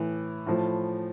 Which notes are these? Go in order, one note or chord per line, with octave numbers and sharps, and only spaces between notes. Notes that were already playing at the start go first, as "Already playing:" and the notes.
Already playing: A2 E3
A2 F3